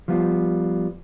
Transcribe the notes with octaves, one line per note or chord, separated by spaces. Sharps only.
F3 G3 B3 F4